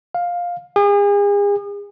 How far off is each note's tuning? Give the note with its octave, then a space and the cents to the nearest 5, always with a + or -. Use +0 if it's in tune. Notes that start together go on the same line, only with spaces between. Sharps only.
F5 +10
G#4 -40